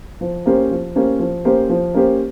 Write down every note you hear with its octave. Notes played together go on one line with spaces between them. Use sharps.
F3
A#3 C#4 G4 C5
F3
A#3 C#4 G4 C5
F3
A#3 C#4 G4 C5
F3
A#3 C#4 G4 C5